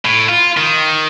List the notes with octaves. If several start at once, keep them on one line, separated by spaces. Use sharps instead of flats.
A2
F4
D#3